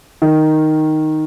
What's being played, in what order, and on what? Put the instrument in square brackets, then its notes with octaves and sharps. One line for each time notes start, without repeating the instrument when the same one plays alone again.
[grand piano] D#3